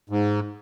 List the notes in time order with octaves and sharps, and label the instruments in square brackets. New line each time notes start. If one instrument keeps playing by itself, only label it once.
[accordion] G#2